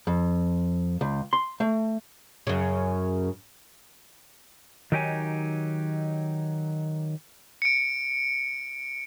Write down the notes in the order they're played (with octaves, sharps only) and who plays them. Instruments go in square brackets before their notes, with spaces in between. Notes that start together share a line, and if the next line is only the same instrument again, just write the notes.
[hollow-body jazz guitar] F2
C#2
C6
A3
[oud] F#2 C#3
[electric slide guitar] D#3 F#3 D#4 G4 C#5 G#5
[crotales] C#7 D7